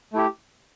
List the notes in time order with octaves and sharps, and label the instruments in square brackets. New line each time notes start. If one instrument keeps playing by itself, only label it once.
[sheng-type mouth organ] A3 E4 G4